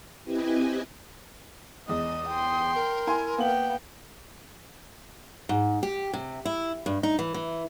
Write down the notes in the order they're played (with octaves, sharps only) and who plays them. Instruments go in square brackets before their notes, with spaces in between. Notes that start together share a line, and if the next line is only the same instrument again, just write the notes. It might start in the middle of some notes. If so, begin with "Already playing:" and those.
[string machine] C4 E4 G4 B4 D#5 G#5
[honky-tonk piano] E2 G#3 [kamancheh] D#5 [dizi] D#6
[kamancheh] G5 C6
[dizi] A#4
[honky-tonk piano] E4 G#5 C6
[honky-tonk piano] A#3 F#7 [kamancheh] B3 G5
[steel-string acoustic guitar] G#2
G4
C3
E4
G2
D#4
E3
E3